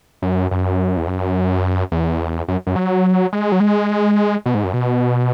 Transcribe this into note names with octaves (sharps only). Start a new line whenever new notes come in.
F#2
F#2
E2
F#2
E2
F#2
F#2
F#3
G#3
F#3
G#3
B2
G#2
F#2
B2